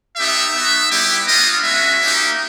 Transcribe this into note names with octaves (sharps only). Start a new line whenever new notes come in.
B3 D#4 G4 E5
B3 D#4 F#4
G3 B3 E4 G4
B3 D4 F4 D#5
G#3 C#4 F#4 E5
A#3 D#4 G4